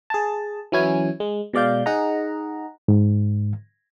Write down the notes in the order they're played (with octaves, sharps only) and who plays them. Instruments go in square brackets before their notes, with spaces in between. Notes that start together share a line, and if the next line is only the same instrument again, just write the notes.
[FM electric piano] G#4 A5
E3 F#3 C#4 E4 G#5
G#3
B2 G#3 D5 F5 G6
D#4 G#4 D#5 F#5 A#5
[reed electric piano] G#2